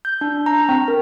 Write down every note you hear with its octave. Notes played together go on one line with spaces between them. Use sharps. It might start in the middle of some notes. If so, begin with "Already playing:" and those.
G6
D4
A#5
C4
A#4